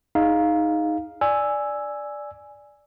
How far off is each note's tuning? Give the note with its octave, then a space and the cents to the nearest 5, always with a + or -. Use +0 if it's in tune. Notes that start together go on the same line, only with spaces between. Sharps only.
D#4 +5 G#4 +5 F5 +0
D5 +0 G#5 +0 E6 +0